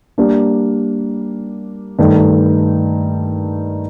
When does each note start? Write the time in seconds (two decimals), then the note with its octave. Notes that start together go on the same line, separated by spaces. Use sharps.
0.18 G3 A#3 D4
1.99 G2 D#3 A3 D#4 A4